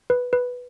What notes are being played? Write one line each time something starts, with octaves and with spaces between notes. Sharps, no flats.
B4
B4